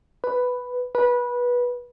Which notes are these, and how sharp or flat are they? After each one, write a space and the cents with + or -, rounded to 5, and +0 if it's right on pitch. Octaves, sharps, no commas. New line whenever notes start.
B4 +5
B4 -20